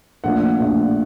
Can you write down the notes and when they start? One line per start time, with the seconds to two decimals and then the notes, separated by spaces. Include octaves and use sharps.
0.24 A#1 A#2 F3 A3 F#5
0.60 A#1 A#2 F3 A3